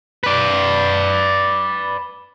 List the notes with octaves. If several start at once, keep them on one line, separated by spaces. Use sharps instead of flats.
B4 D5